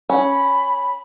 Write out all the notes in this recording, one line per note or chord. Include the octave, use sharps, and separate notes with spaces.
C#4 B5